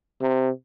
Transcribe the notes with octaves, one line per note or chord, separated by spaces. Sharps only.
C3